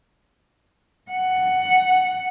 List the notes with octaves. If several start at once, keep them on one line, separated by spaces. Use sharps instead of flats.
F#5